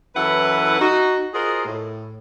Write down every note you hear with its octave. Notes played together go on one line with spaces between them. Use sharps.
F#2 E3 E4 A4 B4 F#5
D#4 F#4
F4 F#4 G#4 A#4 C5 D#5
A2